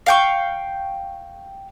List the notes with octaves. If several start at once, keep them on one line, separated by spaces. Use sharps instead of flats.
F5 G5 C#6